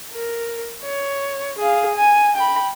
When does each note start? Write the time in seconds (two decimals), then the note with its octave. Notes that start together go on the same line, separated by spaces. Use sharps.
0.13 A#4
0.83 C#5
1.58 G#4 F5
1.95 G#5
2.36 G5 B5